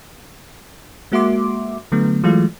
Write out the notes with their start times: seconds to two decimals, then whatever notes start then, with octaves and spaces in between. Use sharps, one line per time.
1.12 G#3 A#3 F#4 E5 C6 D6
1.92 D3 F#3 A3 B3
2.24 E3 F#3 G#3 A3 F4